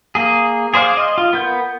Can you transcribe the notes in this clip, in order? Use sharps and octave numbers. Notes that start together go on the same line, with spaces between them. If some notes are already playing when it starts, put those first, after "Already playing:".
A#3 G#4
G#4 C5 D5 F5
D#5
F4
B3 A#4 G6